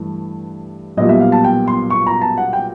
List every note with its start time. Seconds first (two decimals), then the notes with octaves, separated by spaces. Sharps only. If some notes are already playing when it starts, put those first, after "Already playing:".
Already playing: G2 E3 A3
0.97 B1 A#2 G3 B3 D#5
1.09 E5
1.20 F5
1.32 A5
1.44 G5
1.68 C6
1.90 C#6
2.07 A#5
2.22 A5
2.38 F#5
2.53 G5